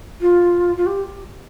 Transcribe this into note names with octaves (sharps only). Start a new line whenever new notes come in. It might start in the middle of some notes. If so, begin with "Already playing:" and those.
F4
F4
G4